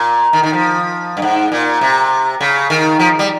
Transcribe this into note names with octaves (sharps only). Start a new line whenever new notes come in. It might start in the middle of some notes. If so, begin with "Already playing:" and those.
Already playing: A#2
D#3
D#3
F3
G2
G#2
A#2
C3
C#3
D#3
F3
G3